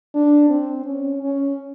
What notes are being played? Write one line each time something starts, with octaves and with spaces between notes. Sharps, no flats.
D4
C4
C#4
C#4